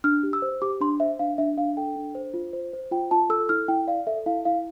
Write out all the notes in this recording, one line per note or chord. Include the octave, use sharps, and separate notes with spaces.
D4 F6
G4
E6
C5
G4 D6
D4 C6
C5 E5
D4 F5
D4 E5
D4 F5
A4 G5
D4
C5
F4
C5
C5
F4 G5
F4 A5
A4 E6
E4 F6
E4 G5
D5 F5
A4 E5
E4 F5
E4 F5